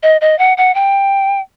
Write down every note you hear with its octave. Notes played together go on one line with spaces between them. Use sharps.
D#5
D#5
F#5
F#5
G5